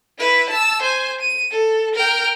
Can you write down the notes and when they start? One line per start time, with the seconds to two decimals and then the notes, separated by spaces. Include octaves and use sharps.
0.19 E4 B4
0.49 A5 E6
0.82 C5 G#5
1.20 D#7
1.51 A4
1.95 A#4 G5